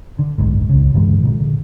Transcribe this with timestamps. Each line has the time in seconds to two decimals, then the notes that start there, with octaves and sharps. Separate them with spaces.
0.19 D3
0.38 F#1 B1 G#2
0.69 C#2 C#3
0.94 G2 D3 E3 G#3
1.23 A#2 D3